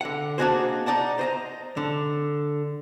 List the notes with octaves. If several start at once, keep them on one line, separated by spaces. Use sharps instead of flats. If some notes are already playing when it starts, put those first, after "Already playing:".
D3 F#5
A#3 D4 D#4 F#4 G#4 C5
D#4 D5 F#5 A5
C5 D#5 A#5
D3